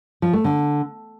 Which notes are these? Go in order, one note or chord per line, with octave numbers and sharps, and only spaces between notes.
F3
A3
D3